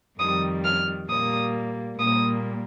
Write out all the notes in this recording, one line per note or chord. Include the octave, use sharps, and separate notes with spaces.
F2 D#3 G3 D#6
F6
A#2 G3 A#3 D#6
A#2 G3 A#3 D#6